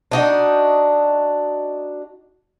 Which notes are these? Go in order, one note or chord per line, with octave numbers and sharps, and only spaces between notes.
D4 D#4 F#4